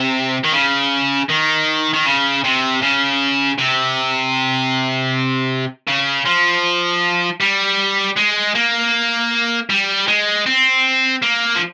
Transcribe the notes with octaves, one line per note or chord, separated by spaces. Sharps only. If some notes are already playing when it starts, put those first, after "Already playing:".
Already playing: C3
D#3
C#3
D#3
D#3
C#3
C3
C#3
C3
C#3
F3
G3
G#3
A#3
G3
G#3
C4
A#3
F3